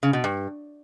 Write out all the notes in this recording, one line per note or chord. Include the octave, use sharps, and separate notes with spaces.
C#3
B2
G2